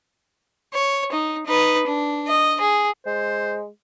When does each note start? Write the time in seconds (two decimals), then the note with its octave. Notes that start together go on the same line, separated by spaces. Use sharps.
0.74 C#5
1.12 D#4
1.46 D#4 B4
1.87 D4
2.28 D#5
2.61 G#4
3.06 G#3 C5